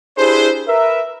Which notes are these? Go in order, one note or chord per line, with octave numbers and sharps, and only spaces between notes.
D4 E4 G4 G#4 B4 C5
A#4 B4 E5